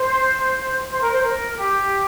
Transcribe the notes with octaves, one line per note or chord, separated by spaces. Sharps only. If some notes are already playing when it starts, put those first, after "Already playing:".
Already playing: C5
C5
A#4
C5
A#4
G4